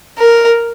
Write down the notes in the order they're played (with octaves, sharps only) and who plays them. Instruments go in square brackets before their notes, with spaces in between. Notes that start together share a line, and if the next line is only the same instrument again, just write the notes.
[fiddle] A#4